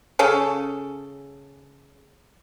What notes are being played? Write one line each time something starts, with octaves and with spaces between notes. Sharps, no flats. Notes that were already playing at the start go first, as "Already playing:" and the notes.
C#3 C#4 A4